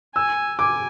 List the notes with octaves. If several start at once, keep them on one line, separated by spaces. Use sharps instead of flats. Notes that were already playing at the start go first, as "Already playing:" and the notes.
G#5 E6
G#5 D6